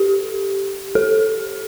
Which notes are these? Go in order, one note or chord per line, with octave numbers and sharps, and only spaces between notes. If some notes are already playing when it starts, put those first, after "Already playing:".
Already playing: G4 A4
A4